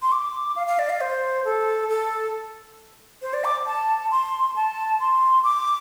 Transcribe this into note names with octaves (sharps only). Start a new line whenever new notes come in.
C6
D6
F5
F5
D5
F5
C5
A4
A4
C5
D5
D6
A5
C6
A5
C6
D6